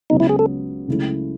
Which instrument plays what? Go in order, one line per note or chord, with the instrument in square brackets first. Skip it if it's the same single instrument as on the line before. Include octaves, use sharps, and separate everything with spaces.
[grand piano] C#2 C#3 F#3 B3 [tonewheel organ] D#4
[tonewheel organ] E4
G#4
A4
[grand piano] C#2 C#3 F#3 A3 E4